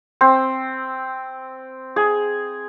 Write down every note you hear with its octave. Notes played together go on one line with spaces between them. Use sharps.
C4
G#4